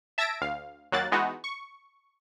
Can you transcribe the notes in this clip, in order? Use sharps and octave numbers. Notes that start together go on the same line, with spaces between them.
E5 A5 E6 G#6 A#6 D7
D2 F5
D#2 F#3 A#3 F#6 A6
E3 G#3 B3 D#4 F#4
C#6